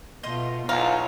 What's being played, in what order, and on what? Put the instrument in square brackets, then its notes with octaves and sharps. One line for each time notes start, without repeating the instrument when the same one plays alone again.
[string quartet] B2 A3 F4 [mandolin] D#5 C6 G6
[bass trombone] B1 [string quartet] E4 C#5 [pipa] F4 [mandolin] A#5